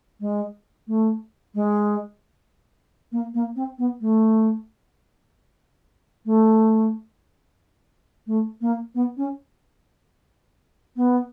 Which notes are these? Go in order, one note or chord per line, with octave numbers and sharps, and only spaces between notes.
G#3
A3
G#3
A#3
A#3
C4
B3
A3
A3
A3
A#3
B3
C#4
B3